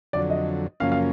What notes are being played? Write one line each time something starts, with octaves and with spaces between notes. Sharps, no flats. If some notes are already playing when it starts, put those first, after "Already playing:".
F2 D3 F#3 D5
D#5
F#2 C#3 F3 A#3 C#4 F5
F5